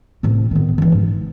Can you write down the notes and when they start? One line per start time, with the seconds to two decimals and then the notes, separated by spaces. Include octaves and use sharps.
0.23 A2 C3
0.51 D#3 B3
0.78 C#3 E3
0.92 G#2